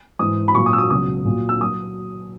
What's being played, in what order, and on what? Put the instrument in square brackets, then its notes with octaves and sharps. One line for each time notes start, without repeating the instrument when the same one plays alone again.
[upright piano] G#2 E3 G#3 D#6
B5
A#2 F#3 C#6
D#6
E6
D#6
C#2 B2 F#3 D#6
A#2 F#3
E6
F#3 D#6